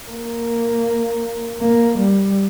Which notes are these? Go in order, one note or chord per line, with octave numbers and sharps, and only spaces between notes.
A#3
A#3
G3